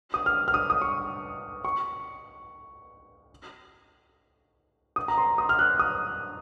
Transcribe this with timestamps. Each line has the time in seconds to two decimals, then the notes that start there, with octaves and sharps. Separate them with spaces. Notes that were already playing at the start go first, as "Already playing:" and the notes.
0.14 D#6
0.26 F6
0.48 F6
0.54 D#6
0.70 D#6
0.82 C#6
1.65 C#6
4.96 D#6
5.08 A#5
5.18 C6
5.38 D#6
5.49 F6
5.59 F#6
5.79 D#6